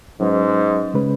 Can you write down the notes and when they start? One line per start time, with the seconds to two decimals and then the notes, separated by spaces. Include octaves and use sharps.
0.20 G#2 F#3 C#4 B4
0.94 C#3 G#3 C#4 B4